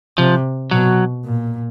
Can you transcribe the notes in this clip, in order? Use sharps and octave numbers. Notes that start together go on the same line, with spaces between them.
C3 F3
B2 F#3
A#2